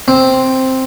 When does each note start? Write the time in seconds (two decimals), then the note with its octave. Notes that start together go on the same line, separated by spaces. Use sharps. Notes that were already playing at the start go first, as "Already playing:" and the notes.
0.08 C4